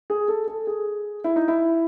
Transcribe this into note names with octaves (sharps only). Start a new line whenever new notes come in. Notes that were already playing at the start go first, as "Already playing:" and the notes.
G#4
A4
A4
G#4
E4
D#4
E4